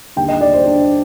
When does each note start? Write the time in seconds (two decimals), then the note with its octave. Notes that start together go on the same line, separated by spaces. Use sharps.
0.16 D#2 D3 G3 G5
0.28 D#5
0.41 D5
0.54 C5
0.66 D4